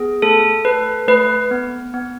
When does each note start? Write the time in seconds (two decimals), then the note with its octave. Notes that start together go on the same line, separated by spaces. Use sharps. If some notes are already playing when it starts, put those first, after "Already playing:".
Already playing: B3 G#4
0.22 A3 A4
0.65 A4 B4
1.08 A3 B4
1.51 B3
1.94 B3